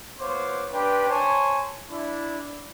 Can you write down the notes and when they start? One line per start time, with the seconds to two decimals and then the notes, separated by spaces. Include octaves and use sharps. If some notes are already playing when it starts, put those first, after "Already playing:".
0.19 B3 F4 C5 C#5 D6
0.72 D4 G4 B4 G5 C6
1.09 C5 C#5 G#5 A5
1.90 D4 E4